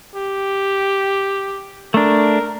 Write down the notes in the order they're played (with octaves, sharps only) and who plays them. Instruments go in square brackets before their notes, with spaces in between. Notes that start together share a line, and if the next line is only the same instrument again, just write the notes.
[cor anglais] G4
[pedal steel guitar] A3 D4 [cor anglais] A#4